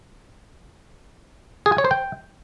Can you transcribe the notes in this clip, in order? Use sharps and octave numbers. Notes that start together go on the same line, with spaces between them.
G#4
G#5
C#5
C5
G5